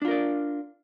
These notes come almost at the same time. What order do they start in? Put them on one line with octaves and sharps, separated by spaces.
D4 F4 A#4 D5